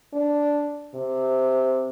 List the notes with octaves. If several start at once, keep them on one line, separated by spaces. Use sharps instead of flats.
D4
C3